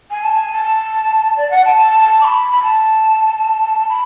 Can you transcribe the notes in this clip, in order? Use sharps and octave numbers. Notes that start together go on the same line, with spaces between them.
G#5
A5
G#5
A5
D5
F#5
A5
A5
A5
D6
B5
B5
A5
B5